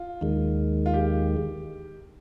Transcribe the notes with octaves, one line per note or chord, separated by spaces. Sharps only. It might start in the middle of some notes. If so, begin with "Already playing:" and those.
Already playing: F4
D#2 D#3 G#3
F4
G4